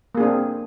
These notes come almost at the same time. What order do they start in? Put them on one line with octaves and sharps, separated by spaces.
A#3 G#4 D4 C4